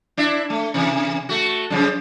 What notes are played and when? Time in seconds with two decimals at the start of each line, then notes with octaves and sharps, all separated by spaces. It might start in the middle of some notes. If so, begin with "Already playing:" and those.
0.17 D4 E4
0.50 A3
0.74 C3 E3
1.29 A3 F#4
1.70 F#2 C#3 F3